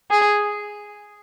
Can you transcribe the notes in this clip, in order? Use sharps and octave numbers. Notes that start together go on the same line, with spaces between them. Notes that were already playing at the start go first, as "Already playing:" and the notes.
G#4